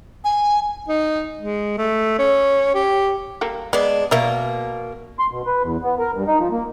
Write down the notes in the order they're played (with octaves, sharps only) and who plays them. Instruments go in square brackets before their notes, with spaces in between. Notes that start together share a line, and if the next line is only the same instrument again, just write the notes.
[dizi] G#5
[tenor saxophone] D#4
G#3
A3
C#4
G4
[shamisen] G3 A#3 A4
[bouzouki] G#3 D4 [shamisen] B3
[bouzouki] B2 A#3 [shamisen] A#4 E5
[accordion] C6
B2
B4
E2
B3
A#4
G2
D#4
F3
A#3